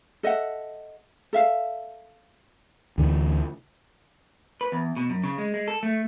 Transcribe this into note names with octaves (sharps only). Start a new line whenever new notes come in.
A4 D#5 E5 F#5
A4 E5 F5
D2 D3 E3
B4
E2
B2
F#2
C#3
G#3
G#3
A4
A3